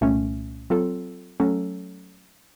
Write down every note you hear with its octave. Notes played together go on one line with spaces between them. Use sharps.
C2 A#2 A3 C#4
F#3 C4 F4 A4
F#3 A3 C#4 A4